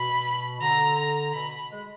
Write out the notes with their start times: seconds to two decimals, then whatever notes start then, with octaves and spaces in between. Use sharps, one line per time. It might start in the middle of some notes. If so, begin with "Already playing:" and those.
Already playing: B2 B5
0.61 D3 A#5
0.98 A#5
1.34 B2 B5
1.71 G#3